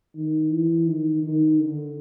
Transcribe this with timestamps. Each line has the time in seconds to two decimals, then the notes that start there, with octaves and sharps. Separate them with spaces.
0.15 D#3
0.51 E3
0.86 D#3
1.22 D#3
1.58 D3